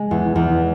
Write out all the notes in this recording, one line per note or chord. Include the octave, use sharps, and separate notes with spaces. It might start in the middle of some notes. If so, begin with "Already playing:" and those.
Already playing: G#3
E2
E2